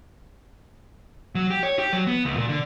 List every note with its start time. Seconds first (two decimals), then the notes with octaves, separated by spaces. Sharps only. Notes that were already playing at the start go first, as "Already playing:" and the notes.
1.35 F#3
1.50 G4
1.63 C#5
1.79 G4
1.93 F#3
2.07 B3
2.25 C#2
2.37 A#2
2.49 D3